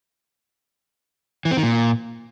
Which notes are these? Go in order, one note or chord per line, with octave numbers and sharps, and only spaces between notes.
E3
C4
D#3
A#2